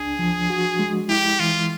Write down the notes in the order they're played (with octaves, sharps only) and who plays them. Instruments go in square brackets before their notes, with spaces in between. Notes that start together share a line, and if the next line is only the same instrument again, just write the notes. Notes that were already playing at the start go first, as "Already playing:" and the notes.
Already playing: [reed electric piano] C#2 D4 [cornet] G#4
[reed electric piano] F3
F#4
G#3
[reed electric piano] E4 [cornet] G4
[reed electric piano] E3 [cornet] F4